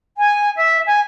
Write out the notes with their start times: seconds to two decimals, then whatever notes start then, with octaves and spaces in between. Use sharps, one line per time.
0.18 G#5
0.57 E5
0.86 G#5